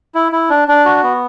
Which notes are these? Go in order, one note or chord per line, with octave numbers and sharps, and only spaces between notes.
E4
E4
D4
D4
F#4
B3